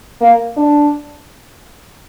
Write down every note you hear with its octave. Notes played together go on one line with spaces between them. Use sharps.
A#3
D4